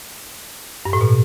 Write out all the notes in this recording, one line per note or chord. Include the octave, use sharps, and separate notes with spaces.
G2
A2
B2